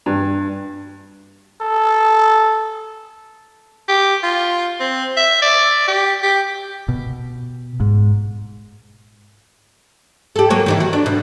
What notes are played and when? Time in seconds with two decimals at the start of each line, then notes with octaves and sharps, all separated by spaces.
0.06 G2
1.61 A4
3.89 G4
4.23 F4
4.80 C4
5.17 E5
5.42 D5
5.88 G4
6.22 G4
6.88 B2
7.80 G#2
10.36 G4 A4
10.50 F#3 A#3 C#5
10.66 D#3 E3 D#4
10.80 F#4
10.93 D4
11.06 B2